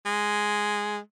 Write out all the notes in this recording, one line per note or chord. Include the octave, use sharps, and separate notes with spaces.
G#3